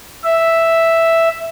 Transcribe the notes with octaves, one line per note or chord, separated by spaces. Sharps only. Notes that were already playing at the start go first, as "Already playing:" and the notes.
E5